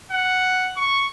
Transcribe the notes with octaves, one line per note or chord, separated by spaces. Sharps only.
F#5
C#6